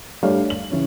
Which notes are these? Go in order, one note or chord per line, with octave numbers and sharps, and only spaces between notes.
G3 A3 D4 C#5 D5 F5
F#7
C#3 E3 C#4